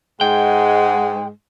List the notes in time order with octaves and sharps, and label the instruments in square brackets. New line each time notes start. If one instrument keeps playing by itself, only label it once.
[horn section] G#2 G#3 [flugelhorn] F#5 [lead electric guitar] G5